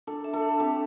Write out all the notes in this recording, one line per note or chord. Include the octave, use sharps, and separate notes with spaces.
D4 A4
E5
A4
D4
C4 G4